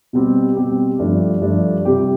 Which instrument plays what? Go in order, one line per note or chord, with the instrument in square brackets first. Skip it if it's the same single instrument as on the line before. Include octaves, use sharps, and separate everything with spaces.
[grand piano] B2 G3 C4 G4
B2 G3 C4 G4
G2 F3 A3 D4
G2 F3 A3 D4
C3 G3 C4 G4